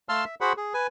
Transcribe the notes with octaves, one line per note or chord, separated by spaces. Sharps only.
A3 F5 A5 C6 E6 F6
E5
F#4 G#4 C5 F#5 B5
G#4
B4 G#5